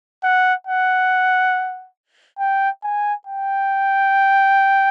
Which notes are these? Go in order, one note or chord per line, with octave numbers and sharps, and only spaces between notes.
F#5
F#5
G5
G#5
G5